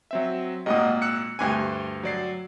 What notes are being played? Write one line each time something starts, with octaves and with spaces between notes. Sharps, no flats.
F#3 C4 E5
G#1 A#2 D#5 F#5 D#6
E6 F#6 C#7
D2 G2 G#5
F#3 D5 C7